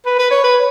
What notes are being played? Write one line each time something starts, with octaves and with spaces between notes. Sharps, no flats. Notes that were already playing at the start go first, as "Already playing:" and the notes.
B4
B4
C#5
B4